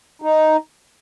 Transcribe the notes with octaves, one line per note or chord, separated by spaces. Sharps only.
D#4